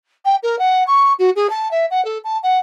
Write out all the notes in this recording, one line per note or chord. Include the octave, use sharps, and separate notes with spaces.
G5
A#4
F#5
C#6
F#4
G#4
A5
E5
F#5
A4
A5
F#5